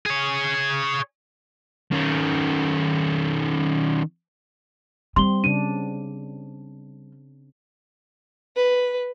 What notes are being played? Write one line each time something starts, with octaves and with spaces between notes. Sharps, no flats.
G#4 C#5
D#3 C#4
G3 C4 C6 G7
C#3 D4 D#7
B4